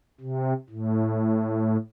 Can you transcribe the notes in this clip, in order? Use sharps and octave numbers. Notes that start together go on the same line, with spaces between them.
C3
A2